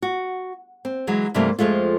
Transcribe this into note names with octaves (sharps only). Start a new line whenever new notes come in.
F#4
C4
E3 F#3 G#3
G2 C3 E3 G3 A3 A#3
F2 F3 G#3 A3 F4